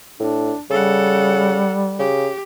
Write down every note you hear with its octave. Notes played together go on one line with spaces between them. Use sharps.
A2 D4
C#3 G3 A4 F#5
C#3 G4